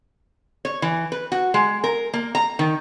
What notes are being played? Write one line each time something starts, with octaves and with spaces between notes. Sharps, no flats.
C#5
E3
B4
F#4
G#3
A#4
A#3
A#5
D#3